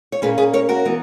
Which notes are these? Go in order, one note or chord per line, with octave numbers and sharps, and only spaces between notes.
C#5
A#2 A#3 C#4 G#4 B4
G#4 B4
A#4 C#5
F#4 A#4
E3 B3